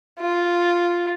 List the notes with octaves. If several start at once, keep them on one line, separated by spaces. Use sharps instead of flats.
F4